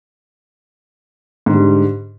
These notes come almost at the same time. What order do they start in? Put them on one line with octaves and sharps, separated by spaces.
G#2 D3 G3